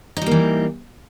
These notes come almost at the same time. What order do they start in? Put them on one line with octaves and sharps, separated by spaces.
D#4 G3 A#3 E3